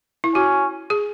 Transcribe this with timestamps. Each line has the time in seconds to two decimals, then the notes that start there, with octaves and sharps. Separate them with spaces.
0.24 E4
0.34 C#4 F#4
0.90 G#4